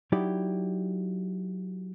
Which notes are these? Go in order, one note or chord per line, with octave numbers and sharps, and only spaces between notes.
F#3 D#4 E4 G4 D5